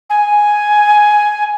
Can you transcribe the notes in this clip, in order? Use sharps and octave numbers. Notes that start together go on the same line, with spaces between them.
G#5